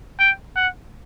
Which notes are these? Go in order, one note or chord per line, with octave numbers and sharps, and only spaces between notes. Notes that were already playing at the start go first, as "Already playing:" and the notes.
G5
F#5